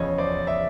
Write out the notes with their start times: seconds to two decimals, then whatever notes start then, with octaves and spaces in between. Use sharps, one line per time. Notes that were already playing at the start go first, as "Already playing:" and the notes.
Already playing: E2 C#3 F3 C#5 D#5
0.18 C5 D5
0.47 D5 E5